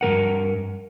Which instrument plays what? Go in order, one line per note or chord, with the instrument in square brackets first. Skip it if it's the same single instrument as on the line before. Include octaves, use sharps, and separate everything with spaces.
[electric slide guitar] G2 E3 A#4 F#5